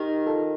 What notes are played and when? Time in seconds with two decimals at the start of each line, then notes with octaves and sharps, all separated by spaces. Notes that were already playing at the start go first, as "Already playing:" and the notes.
Already playing: D#3 D#4 G4
0.27 F4 A4